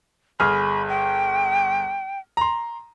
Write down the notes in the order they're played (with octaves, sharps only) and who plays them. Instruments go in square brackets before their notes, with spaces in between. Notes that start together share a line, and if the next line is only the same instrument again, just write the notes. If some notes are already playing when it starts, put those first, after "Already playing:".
[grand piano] G1 G#4 F6 [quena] B5
[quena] G5
[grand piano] A#5 C6